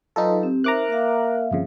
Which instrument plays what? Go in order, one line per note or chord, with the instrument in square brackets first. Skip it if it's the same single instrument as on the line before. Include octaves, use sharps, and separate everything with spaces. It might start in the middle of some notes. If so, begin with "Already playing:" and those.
[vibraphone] F#3 B4 [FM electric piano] D#4 F4 A4
[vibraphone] C4 G4
[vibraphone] D#4 C5 E5 [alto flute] A#4 [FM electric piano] A#5 D6 F#6
[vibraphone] A#3 E5 F5
[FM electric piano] G1 F2 C#3